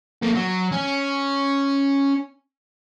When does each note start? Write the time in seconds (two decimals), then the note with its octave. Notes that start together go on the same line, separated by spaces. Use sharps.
0.22 A#3 A4
0.35 F#3
0.72 C#4